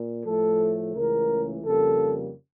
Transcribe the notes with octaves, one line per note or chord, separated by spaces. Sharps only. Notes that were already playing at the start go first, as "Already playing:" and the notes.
Already playing: A#2
A2 F3 A3 A4
C#2 C#3 E3 A3 A#4
F2 C#3 G3 A#3 A4